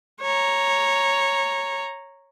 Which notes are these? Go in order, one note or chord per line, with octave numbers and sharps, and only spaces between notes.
C#5 A#5